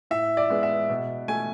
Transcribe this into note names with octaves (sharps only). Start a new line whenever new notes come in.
A2 E5
D5
G#3 B3
E5
B2
A3 G#5